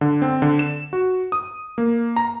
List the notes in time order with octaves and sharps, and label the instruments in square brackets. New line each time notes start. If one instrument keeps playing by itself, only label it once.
[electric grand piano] D3
C4
D3
E7
F#4
D#6
A#3
A#5